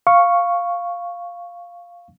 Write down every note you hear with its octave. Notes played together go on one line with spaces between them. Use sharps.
F5 C#6